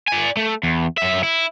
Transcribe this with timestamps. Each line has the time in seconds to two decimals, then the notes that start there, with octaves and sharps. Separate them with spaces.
0.08 D5 G#5
0.37 A3
0.63 E2
0.98 F#2 E5
1.23 E4